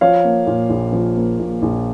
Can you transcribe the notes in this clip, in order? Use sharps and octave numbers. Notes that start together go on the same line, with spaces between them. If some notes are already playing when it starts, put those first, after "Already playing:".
F3 C#5 F5
A#3
A#2
A#1
F3
A#3
A#2
A#1